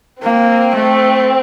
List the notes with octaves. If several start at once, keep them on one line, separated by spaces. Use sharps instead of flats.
A#3 C4
A3